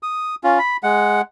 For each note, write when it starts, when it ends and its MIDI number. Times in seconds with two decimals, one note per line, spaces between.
0.03 0.35 87
0.44 0.59 61
0.44 0.59 65
0.59 0.77 83
0.83 1.21 56
0.83 1.21 78